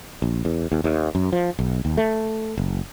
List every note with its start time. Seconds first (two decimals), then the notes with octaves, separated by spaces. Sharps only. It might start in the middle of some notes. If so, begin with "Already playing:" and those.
0.22 A#1
0.45 E2
0.72 D#2
0.84 D#2
1.15 F#2
1.32 F3
1.59 B1
1.85 D#2
1.97 A3
2.58 F#1